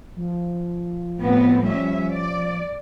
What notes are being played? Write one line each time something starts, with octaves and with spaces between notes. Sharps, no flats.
F3
A2 B3 C4
G3 C#4 E5
D5